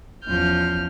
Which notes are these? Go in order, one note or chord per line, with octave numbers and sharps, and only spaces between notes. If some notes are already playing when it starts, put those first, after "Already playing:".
E2 F3 C#4 F6 G6